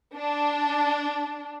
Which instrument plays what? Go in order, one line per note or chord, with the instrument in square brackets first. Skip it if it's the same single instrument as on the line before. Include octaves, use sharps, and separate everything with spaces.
[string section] D4